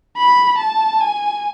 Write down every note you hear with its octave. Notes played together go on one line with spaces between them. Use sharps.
B5
A5
G#5